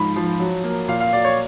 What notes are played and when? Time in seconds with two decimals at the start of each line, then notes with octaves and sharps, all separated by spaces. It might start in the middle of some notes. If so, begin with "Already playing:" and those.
Already playing: G#2 F3 B5
0.16 F3
0.40 F#3
0.64 A#3
0.88 A#2 F5
1.00 F5
1.13 F#3 D5
1.25 C#5